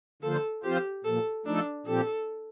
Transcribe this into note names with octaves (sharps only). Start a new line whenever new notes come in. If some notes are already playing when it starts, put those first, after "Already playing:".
D3 F3 A#3 F4 A4 C5
F3 C4 F4 G4 C5
A#2 F3 A#3 A4
F3 A3 D4 D#4 A4
A#2 F3 C4 G4 A4